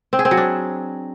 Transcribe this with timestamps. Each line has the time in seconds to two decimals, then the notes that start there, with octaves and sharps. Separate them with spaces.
0.13 C4
0.19 G#4
0.25 C4
0.31 F#3
0.37 D4